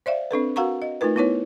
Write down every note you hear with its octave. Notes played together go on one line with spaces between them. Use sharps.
C5 D5 E5 F5
C4 D4 A4 B4
F#4 A#4 F5 F#5 A#5 C#6
D#5
A3 D#4 F4 A#4 B4
B3 D#4 E4 B4 C#5